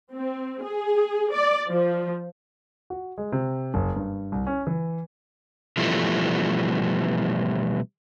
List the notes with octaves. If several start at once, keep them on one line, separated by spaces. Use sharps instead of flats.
C4
G#4
D5
F3
F#4
G#3
C3
F#1
G2
C2
C#4
E3
B2 E3 F3 G3 A3